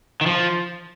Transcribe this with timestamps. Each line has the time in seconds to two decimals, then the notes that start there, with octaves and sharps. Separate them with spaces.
0.21 D#3
0.26 F3